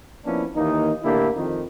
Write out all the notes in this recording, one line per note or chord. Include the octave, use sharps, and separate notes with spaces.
F3 A#3 B3 C#4 D4 E4
D#2 E3 A#3 D#4
A2 D3 A#3 D4 E4 G4
F2 D#3